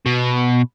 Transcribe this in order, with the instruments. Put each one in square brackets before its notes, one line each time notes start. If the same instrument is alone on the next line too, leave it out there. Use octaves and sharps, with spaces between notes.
[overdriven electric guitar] B2